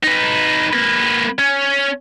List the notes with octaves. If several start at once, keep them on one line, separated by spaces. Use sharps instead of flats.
D#4 B4
A#3 B4
C#4